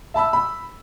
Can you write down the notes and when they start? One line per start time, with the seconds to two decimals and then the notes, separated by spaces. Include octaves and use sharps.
0.14 E5 A5 B5 E6
0.33 B5 E6